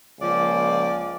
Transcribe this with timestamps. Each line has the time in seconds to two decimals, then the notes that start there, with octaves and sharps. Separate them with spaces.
0.21 C#2 F3 A#3 D5